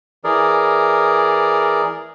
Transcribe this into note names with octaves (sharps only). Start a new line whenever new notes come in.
E3 G#4 A#4 D5